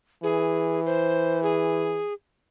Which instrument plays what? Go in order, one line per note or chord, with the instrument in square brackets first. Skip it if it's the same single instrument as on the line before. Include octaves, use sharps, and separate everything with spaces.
[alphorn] E3 [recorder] G#4
[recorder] C5
G#4